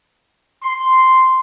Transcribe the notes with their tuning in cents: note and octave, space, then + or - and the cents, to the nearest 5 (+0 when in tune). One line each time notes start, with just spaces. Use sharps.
C6 -5